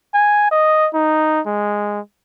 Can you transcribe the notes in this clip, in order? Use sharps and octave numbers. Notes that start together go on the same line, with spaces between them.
G#5
D#5
D#4
G#3